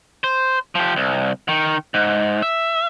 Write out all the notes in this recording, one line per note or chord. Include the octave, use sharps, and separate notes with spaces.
C5
F3 G4
C2
D#3
G#2
E5